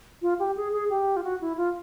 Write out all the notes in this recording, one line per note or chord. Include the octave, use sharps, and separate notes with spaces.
F4
G4
G#4
G#4
G4
F4
F#4
E4
F4